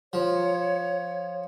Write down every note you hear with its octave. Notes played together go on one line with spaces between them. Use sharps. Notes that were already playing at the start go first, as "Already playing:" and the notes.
F3 C#5